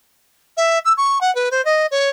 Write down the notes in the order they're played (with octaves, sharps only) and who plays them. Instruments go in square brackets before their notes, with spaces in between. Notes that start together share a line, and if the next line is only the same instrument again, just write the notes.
[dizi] E5
E6
C#6
F#5
B4
C5
D#5
C#5